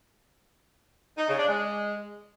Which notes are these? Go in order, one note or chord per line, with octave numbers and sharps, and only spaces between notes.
D#4
C#3
D4
G#3